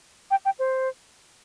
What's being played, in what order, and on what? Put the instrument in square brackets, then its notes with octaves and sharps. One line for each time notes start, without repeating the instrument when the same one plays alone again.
[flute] G5
G5
C5